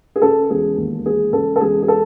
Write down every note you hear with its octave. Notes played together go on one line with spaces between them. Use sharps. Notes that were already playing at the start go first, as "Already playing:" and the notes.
G#4
C#3 A4
E1 G#4
D#2
E1 G#4
C#3 A4
A4
E1 G#4
G#4
A4